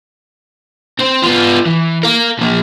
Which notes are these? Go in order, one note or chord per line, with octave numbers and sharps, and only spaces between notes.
C4 C5
B3 F4
E3
A#4 F5
F3 A#3